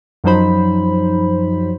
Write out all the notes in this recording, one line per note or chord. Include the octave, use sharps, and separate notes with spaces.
F#2 F3 F#3 D#4 C5 B5